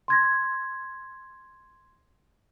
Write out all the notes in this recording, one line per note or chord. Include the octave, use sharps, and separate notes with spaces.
C6 G#6 A#6